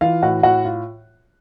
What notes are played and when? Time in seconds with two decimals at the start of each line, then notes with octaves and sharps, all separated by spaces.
0.01 E3 F4 F5
0.23 A2 F#4 F#5
0.43 A2 F#4 F#5
0.65 F4